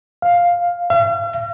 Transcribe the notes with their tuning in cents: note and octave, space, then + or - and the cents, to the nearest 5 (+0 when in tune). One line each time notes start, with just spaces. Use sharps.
F5 +5
F5 -45